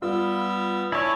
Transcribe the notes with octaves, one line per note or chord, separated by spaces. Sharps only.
G3 B3 F4 E6
E4 C#5 D5 G#5 A5